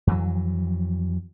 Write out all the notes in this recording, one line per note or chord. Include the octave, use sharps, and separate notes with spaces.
F2 E3 F#3